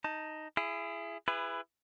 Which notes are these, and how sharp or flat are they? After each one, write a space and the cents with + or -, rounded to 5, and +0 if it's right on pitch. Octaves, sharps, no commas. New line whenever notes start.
D#4 +0 A5 +20
E4 +30 G#4 +0
E4 +20 G#4 -30 B4 +10